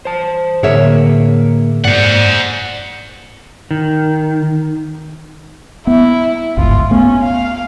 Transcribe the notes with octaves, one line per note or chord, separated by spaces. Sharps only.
C5 A5
A2 D3 A#3 G#4 A#4 C#5 E5 F#5
G#2 A#3 C5 D5 F#5
D#3
B3 E4
G1 C#2 G#2 F4
A3 B3 C#4
F5